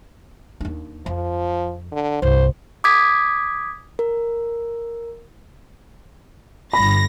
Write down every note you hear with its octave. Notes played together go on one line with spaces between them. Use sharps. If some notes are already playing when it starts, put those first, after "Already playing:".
D#2 D4
F2 F3
D3
C2 G2 C5
D6 D#6 G#6 B6
A#4
G1 G2 B5 A#6